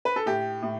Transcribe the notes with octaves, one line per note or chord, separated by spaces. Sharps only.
B4
A4
A2 G4
A2